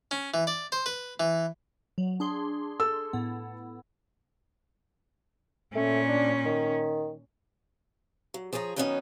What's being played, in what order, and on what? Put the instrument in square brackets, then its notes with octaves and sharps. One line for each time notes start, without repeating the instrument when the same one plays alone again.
[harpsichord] C#4
E3
D5
C5
B4
E3
[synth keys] F#3
D4 G#4 C6
[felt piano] A4 E6
[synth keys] A2 B3
[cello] A#2 C#4 [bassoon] A3
[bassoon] D4
D#3
[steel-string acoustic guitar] F#3
F3 G#4 C#5 G5 A#5
D#3 F#3 G3 B3 C#4 D#4